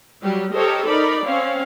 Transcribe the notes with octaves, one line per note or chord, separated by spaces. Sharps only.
F#3 G3 G4
G4 A4 A#4 C5 C#5 D#5
D#4 A#4 D5 B5
C4 C#4 C#5 F5